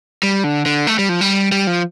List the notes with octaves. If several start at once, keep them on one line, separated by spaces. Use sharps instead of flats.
G3
D3
D3
A3
G3
F3
G3
G3
F3